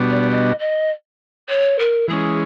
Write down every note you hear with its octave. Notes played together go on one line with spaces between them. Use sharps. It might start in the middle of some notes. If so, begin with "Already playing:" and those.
Already playing: B2 G3 B3 D4 F#4
D5
D#5
D#5
C#5
A#4
E3 G#3 C#4 G#4